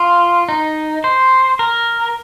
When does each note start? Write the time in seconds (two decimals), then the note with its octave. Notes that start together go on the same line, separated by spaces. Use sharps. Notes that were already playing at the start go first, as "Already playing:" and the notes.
Already playing: F4
0.49 D#4
1.04 C5
1.59 A#4